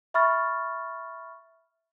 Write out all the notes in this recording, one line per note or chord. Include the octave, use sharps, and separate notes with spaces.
E5 B5 C#6 F6 A6